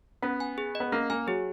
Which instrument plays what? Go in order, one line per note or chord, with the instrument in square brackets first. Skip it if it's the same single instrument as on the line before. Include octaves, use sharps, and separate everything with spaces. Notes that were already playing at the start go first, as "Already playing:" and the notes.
[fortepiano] B3 [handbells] C#4
[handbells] G#5
G#4
D#5
[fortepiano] B3
[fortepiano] A#3 [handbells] C#4
[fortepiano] A#3 [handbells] G#5
[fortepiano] F#3 [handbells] G#4